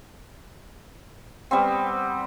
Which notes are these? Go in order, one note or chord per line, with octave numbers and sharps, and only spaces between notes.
G3 B3 C4